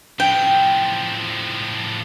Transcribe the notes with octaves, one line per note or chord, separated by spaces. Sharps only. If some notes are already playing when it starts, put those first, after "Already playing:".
A2 F3 G5